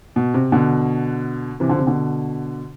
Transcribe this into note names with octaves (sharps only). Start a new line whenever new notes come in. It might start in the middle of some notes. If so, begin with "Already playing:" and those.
B2
C3
B2 D3
C3 E3
D3 F3
C3
B2 D3